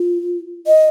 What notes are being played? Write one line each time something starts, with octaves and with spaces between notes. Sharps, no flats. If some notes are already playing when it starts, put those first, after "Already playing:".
Already playing: F4
D#5